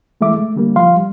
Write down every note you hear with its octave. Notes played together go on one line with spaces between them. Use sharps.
E3 G#3 A3 E5 D6
A3
D3 G3 A#3
F3 F5 C6
G3